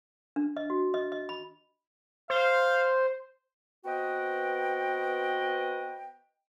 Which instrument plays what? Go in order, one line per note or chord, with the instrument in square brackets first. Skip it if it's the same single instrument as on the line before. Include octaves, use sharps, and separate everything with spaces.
[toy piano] D4
D#5
F#4
D#5
D#5
B5
[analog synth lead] C5 [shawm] F5
[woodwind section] B3 C4 F#4 B4 D#5 G5